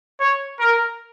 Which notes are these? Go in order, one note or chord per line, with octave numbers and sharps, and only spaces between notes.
C#5
A#4